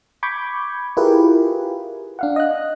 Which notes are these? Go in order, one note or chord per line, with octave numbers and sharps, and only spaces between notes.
B5 C#6 D6 G6 G#6
E4 F4 G4 G#4 A#4 B4
D4 F5 F#5
D#5 F#6